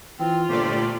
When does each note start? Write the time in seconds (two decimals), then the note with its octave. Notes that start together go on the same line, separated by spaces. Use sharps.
0.19 E3 C4 F4
0.49 G1 A#2 A3 G4 C5 D5